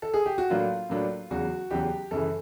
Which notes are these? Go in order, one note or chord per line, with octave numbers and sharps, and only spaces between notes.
A4
G#4
G4
F#4
A2 F#3 A#3 D4 F4
A2 F#3 A#3 D4
E2 C#3 F#3 F#4
E2 C#3 F#3 G4
F#2 C#3 E3 A4